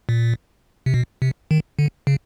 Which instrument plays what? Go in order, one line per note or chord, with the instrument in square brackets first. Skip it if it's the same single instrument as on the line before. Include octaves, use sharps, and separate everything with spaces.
[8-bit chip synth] A#2
C3
B2
C3
D#3
D3
C#3